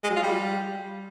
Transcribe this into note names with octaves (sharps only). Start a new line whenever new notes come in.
G#3
F#3
F4
G3